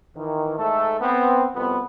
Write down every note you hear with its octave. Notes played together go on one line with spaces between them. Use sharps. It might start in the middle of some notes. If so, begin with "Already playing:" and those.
D#3 E3
G#2 A3 A4
B3 C4
C2 F2 B3